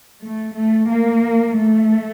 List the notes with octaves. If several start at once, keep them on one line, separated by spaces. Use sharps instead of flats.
A3
A3
A#3
A3